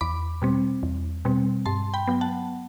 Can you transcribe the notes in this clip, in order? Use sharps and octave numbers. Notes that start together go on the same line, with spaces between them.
E2 B5 D6
B2 G3 C4
E2
B2 G3 C4
G2 A5 C6
G5 B5
F#3 B3
F#5 A5